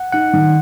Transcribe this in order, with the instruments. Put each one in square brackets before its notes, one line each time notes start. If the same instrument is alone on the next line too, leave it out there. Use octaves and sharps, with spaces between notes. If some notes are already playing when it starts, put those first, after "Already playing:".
Already playing: [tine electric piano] F#5
[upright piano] D#4 [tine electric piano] F#5
[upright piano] D#3